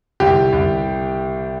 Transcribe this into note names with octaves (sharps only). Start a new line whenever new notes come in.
C2 G4
C2